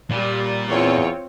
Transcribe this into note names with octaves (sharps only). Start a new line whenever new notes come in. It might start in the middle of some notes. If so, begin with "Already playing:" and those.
A#2 G3
E2 C4 F4 C#5